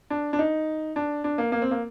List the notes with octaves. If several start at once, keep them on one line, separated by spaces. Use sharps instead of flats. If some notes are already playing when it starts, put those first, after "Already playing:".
D4
D4
D#4
D4
D4
A#3
A#3
C4
A#3